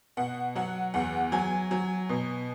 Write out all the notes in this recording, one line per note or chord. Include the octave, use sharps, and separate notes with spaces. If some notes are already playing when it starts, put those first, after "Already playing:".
B2 F#5
F#3 F#5
E2 F#5
F#3 G#5
F#3
B2